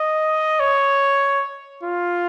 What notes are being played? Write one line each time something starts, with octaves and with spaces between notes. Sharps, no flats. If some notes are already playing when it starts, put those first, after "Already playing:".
Already playing: D#5
C#5
F4